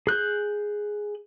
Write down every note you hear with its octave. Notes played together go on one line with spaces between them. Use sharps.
G#4 F#6 G6